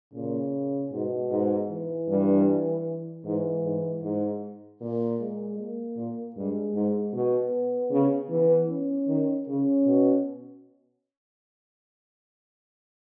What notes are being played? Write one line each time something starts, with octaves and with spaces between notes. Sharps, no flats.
A#2 C#3
G#2 B2
G#2
E3
G2
G#2 E3
G#2
G#2
A#2
G#3
A#3
A#2
G2 G#3
G#2
B2 B3
C#3
E3 B3
C#4
D#3
C#3 C#4
B2